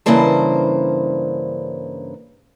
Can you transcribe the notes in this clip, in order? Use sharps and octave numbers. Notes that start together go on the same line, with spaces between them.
G2 C#3 E3 A#3 C5 A5